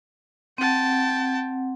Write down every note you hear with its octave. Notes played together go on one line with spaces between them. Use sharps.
C4 F#5 G5 A5